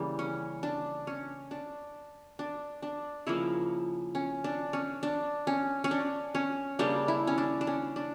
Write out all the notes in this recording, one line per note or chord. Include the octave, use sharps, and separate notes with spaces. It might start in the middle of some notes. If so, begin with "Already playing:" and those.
Already playing: C#3 E3 G3 A#3
C#4
D4
C#4
D4
D4
D4
C#3 F3 A#3 E4
C#4
D4
C#4
D4
C#4
C#4
D4
C#4
C#3 G3 A#3 D4
E4
C#4
D4
D4
C#4
D4